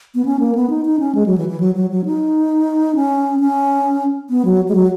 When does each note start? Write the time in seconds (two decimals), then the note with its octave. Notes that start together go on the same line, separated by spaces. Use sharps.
0.15 B3
0.25 C#4
0.40 A#3
0.55 B3
0.70 D#4
0.85 D#4
1.00 C#4
1.15 G#3
1.26 F#3
1.38 E3
1.48 E3
1.60 F#3
1.75 F#3
1.90 F#3
2.05 D#4
2.95 C#4
3.40 C#4
4.30 B3
4.45 F#3
4.68 G#3
4.75 F#3